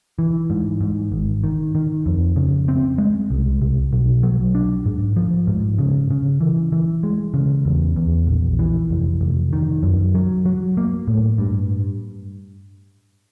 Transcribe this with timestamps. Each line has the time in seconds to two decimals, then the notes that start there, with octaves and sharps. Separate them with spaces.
0.19 E3
0.50 G#2
0.81 G#2
1.12 G#1
1.44 D#3
1.75 D#3
2.06 F2
2.36 C#3
2.68 C4
2.98 G#3
3.30 C2
3.62 C2
3.93 B1
4.23 F#3
4.55 D4
4.86 G#2
5.16 F3
5.47 G#2
5.79 C#3
6.10 C#3
6.41 E3
6.72 E3
7.03 G#3
7.34 C#3
7.65 E2
7.96 E2
8.27 A#1
8.59 E3
8.90 F1
9.21 F1
9.53 D#3
9.83 F#2
10.14 F#3
10.45 F#3
10.77 A#3
11.07 A2
11.38 G2